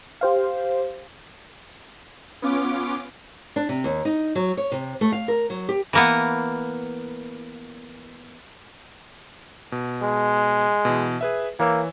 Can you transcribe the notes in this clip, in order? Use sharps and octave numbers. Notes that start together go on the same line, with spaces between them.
G4 C5 F5
B3 C#4 F4 D6
D4
C3
D#2
D#4
F#3
C#5
C3
A3
F5
A#4
F#3
G4
E3 A#3 B3
B2
G#3
B2 E3
G#4 B4 E5
E3 A#3 C#5 E6